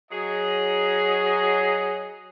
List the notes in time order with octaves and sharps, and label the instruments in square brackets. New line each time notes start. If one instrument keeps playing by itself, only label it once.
[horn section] F#3 G#4 D#5